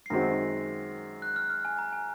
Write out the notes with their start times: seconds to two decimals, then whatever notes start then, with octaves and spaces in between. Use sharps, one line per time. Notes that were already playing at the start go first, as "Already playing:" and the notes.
0.06 C7
0.10 F#2 D#3 G#3 C4 F#4 A#6
1.22 F#6
1.36 F6
1.50 F6
1.65 G#5
1.78 A#5
1.93 G#5